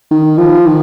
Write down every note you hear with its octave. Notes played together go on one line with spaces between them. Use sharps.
D#3
F3
D#3